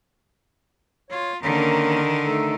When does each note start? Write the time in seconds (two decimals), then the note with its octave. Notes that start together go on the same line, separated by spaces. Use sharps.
1.11 F4 C#5
1.43 D3 D#3 A#3 C#4 A#5
2.25 A3 D#4 A4